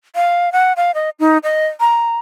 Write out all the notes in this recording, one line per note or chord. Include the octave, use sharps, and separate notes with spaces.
F5
F#5
F5
D#5
D#4
D#5
A#5